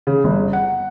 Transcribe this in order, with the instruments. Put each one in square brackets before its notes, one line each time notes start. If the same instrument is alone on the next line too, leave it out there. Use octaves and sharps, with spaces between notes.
[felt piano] C#3
G1
F#5